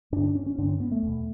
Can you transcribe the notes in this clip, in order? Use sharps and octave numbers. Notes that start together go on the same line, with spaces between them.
G2 D3 D4
D4
C#4
C#4
G2 D3 D4
C#4
B3
A3
E2 B2